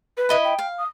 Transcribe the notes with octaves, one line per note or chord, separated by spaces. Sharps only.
B4
E4 D#5 B5
G5
F5
D#6